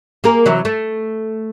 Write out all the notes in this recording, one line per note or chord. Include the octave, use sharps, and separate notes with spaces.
A#3 G#4 A#4
C3 E3 F#3
A3